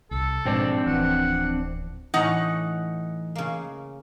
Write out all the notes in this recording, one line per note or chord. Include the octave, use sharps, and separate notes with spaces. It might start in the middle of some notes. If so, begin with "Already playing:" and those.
C2 A4
F2 G#2 B2 C4 D4
D1 E3 F#5
A2 E3 C#4 D#4 F#5
C#3 A#3